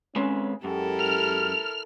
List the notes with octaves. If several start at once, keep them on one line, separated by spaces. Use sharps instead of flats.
G#3 C4 C#4 B4
F#2 G#3 E4 G4 A4 A#4
F6